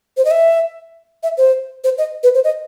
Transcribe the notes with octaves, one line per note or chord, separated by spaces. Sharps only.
C5
D#5
E5
E5
C5
C5
D#5
B4
C5
D#5